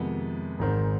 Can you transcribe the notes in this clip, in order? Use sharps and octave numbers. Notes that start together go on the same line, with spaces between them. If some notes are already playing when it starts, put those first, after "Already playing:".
Already playing: F2 C3 D#3 G#3 B3
G#1 G#2 D#3 G#3 C4